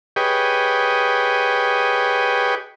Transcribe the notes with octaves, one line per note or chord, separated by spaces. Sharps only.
G4 G#4 B4 C#5 D#5 G5